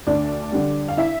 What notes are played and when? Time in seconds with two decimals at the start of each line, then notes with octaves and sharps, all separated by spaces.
0.07 D2 D4 D5
0.52 D3 G3
0.88 F5
0.97 E4 E5